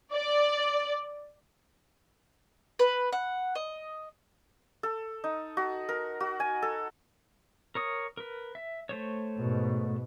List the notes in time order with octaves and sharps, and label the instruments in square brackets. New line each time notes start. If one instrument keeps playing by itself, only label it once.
[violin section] D5
[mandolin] B4
F#5
D#5
[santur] A4
D#4
F#4
A#4
F#4
G#5
A4
[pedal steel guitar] A#4 C#5 D#6
A#4 B4
E5
A3 C5 C#5
[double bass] G#2 B2